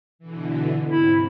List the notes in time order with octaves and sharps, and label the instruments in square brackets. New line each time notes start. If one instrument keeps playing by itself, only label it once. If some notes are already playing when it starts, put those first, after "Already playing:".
[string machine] B2 D3 E3
[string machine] G#2 C3 [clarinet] E4